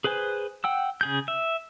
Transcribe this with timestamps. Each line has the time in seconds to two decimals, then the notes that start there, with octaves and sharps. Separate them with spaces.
0.04 G#4 B4 C5 G#5
0.64 F#5 G5 E6
1.01 C#3 G#4 G6
1.28 E5